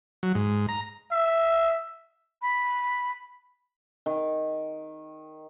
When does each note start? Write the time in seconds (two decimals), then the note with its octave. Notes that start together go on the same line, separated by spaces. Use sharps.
0.23 F#3
0.35 G#2
0.69 A#5
1.11 E5
2.42 B5
4.06 D#3